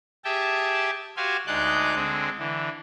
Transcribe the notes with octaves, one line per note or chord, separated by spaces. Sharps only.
G4 G#4 E5 G5 A5
F#4 G4 C5 F5 G#5 C6
D2 G#3 D#4 D5 F#6 G6
D3 G#3 C4
D3 E3